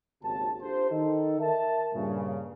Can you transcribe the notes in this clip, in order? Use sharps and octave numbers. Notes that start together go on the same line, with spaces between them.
G#1 D#2 C#3 C4 F#4 A5
D4 F4 G4 A4 C5
D#3 D#4 A4
A#4 E5 A5
G2 A#2 C#3